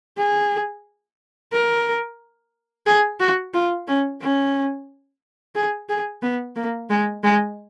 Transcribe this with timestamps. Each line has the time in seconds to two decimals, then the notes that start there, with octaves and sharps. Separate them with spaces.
0.18 G#4
1.52 A#4
2.86 G#4
3.20 F#4
3.54 F4
3.87 C#4
4.21 C#4
5.55 G#4
5.89 G#4
6.22 B3
6.56 A#3
6.90 G#3
7.24 G#3